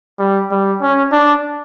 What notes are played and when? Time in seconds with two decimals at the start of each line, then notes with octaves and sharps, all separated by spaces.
0.19 G3
0.51 G3
0.82 C#4
1.12 D4